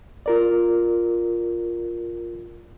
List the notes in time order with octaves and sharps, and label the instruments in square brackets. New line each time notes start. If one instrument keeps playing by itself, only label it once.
[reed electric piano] F4 A#4 D5